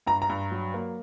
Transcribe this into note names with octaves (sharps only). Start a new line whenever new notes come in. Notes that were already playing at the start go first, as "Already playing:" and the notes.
G2 A#5
A#5
G2
F#3
A#3